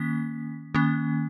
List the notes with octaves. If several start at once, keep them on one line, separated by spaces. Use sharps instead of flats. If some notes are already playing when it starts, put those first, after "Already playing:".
Already playing: D#3 A#3 C#4 B6
D#3 A#3 C#4